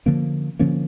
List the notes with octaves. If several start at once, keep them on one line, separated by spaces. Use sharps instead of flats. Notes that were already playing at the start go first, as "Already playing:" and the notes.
D3 F3 A#3 C#4
D3 F3 A#3 C#4